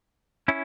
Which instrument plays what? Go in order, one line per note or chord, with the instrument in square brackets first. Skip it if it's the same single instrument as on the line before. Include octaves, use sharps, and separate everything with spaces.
[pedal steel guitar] C#4 E4